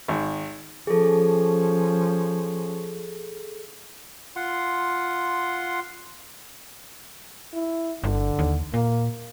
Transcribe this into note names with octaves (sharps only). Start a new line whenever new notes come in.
G#1
F3 C#4 G#4 A4
F4 F#5 C6
E4
G1 D3
D#2
A#2 A#3